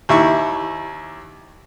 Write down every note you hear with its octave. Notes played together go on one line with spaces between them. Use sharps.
D#2 E4 C#6